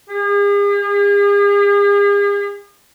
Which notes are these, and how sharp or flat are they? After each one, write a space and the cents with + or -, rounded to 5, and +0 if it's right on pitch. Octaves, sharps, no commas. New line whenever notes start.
G#4 -45